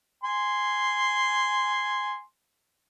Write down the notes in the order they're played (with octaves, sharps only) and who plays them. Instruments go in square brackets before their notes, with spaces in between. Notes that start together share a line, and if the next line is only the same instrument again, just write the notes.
[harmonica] G#5 C6